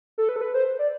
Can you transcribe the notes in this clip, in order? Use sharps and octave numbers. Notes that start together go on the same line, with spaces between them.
A4
B4
A4
B4
C5
D5